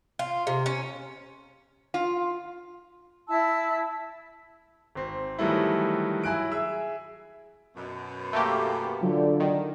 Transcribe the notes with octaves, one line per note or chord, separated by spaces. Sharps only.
F4
C3
C#4
F4
E4 A5 E6
G#1 C4
D#3 E3 F#3 G3 A3 E4
F#3 E4 G#5 F#6 D7
G#4 E5 E6
F#2 B2
A3 A#3 G4
D3 F#3 F4
D#3